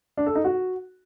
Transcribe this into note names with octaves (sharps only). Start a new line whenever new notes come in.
D4
A4
D#4
F#4